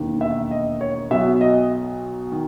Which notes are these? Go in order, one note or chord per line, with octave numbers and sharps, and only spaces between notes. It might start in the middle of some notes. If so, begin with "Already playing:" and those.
Already playing: E1 D#2 D#3
E5
D#5
C#5
B1 B2 F#3 E5
D#5
D#3